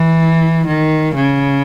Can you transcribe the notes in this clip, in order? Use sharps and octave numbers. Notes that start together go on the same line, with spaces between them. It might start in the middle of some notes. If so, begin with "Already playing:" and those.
Already playing: E3
D#3
C#3